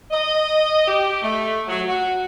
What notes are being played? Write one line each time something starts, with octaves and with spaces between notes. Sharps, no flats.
D#5
G4
A3
F#3
F#4